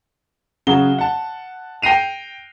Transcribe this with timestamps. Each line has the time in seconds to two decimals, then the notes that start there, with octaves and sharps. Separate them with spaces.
0.67 C#3 F#3 F#4 G#4 G7
0.98 F#5 A5
1.82 G5 A#6 C7 D#7 F7